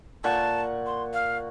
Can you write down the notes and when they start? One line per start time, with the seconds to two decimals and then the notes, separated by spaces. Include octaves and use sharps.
0.24 A#2 F#5 A5 C#6
0.86 C6
1.14 F5